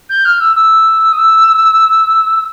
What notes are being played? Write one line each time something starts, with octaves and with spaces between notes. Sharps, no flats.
G6
F6
E6
E6
D#6
E6